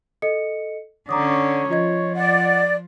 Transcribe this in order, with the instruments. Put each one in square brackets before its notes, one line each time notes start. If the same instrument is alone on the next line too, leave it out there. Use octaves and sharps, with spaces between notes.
[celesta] A4 D#5 C#7
[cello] D3 C#4 [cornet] C#5 [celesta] A#5 D6 D#6
[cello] F3 [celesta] F4 D#5 G#6
[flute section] D5 [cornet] F#5